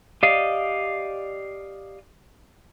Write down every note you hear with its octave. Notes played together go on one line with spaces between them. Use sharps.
G4 D5 D#5 F5